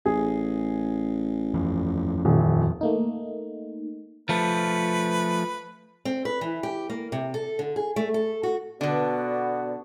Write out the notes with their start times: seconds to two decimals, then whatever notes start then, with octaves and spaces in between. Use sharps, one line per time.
0.05 A1 G#4
1.54 F2 E3 F3
2.25 D#1
2.81 A3 A#3 D#4
4.29 F3 A3 B4
6.05 C4
6.25 B4
6.41 E3
6.63 G4
6.90 A#3
7.12 C3
7.34 A4
7.59 D3
7.76 G#4
7.96 A3
8.14 A4
8.43 F#4
8.81 B2 D3 B3 D4 F#4 B4 D5